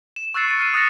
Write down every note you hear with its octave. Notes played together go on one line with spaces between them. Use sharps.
E7
C#6 E6 F#6 A6 C7 C#7
A6 D7 D#7
F6 C7 D#7
D#6 F#6 A6 A#6 C#7 F7